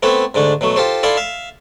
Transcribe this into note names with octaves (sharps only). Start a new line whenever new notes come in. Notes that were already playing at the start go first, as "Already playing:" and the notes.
A3 B3 C4 E4 A4
G#2 D3 A3 D4
B2 F#3 A3
F4 G4 A4 C5
E4 F4 A4 D5 C6
E5 F5